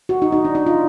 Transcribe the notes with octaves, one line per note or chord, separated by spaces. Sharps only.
F#4
D#4
D#4
D4
D#4
F4